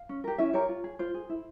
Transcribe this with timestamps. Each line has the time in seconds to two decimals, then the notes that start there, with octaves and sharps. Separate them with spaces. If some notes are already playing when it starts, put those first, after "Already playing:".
Already playing: F5
0.09 C#4
0.24 G4 A#4
0.38 C#4 E4 E5
0.53 G4 A#4 C#5
0.69 F4
0.84 G#4
0.99 F4 C5
1.14 G#4
1.29 E4